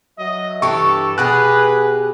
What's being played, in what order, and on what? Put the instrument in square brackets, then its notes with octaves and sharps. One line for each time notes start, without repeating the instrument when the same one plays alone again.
[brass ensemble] F#3 E5 [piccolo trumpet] D#5
[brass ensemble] G2 [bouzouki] E3 G4 [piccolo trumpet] A4 [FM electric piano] C#6
[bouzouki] B2 G4 G#4 [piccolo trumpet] B4 [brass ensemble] G#5 [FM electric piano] F#6